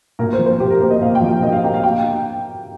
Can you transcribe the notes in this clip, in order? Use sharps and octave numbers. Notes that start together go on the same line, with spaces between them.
A#2 A#4
C5
F3
C5
A#2 G4
A#4
A#3 C5
D#5
A#2 F5
G5
F3
F5
A#2 D#5
F5
A#3 G5
F5
G5